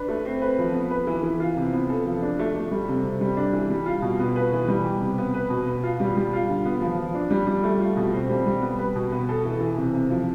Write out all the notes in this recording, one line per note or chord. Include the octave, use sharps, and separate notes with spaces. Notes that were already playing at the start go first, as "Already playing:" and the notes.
Already playing: D4 B4
A3
C4
B4
F3
B3
B4
E3
E3
F4
C3
B3
A4
F3
D4
A3
A3
G3
C3
C3
G3
D4
E3
G3
F4
B2
B3
B4
E3
G3
G4
C3
B3
B4
B2
B3
F4
G3
G3
F4
D3
B3
F3
F3
D4
G3
G3
A3
F4
B2
C4
G3
G3
B3
B4
B2
B3
A4
E3
E3
C3
C3
F3